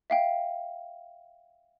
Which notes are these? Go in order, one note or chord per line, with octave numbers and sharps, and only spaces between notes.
E5 F5 G5